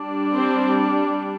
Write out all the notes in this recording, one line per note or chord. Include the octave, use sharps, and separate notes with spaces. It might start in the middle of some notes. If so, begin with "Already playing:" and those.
Already playing: G3 D4
C4 C5